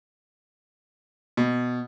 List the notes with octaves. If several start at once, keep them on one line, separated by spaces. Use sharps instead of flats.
B2